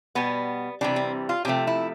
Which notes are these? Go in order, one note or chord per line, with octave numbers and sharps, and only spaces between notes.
B2 G3 B3
C3 E3 G3 D4
C4
F4
C3 F3 A3 G4
E4